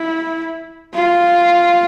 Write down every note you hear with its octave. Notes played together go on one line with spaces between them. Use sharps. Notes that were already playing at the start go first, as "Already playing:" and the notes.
Already playing: E4
F4